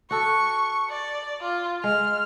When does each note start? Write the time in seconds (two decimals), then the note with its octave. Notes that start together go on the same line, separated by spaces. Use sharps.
0.11 F#4 A4 C#6
0.90 D5
1.41 F4
1.84 G#3 F6